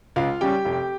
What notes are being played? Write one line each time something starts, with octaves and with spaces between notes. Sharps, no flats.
C#2 F4 F5
C#3 G3 C#4 G4 G5
F1